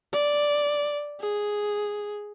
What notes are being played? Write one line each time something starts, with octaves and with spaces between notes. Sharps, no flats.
D5
G#4